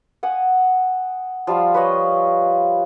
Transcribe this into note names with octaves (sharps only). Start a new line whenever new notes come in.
F#5 G#5 D#6
F3 G3 F4 F5
B4 C#5 D#5